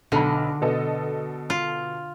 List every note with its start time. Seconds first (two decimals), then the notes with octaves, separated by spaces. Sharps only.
0.12 B1 D3 B5
0.61 B2 A4 D#5
1.50 F4